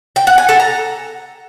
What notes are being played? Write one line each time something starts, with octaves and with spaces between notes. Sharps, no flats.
G5
F#5
G#5
A4
A#5